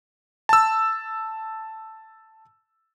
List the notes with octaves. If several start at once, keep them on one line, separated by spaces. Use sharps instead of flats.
A5 E6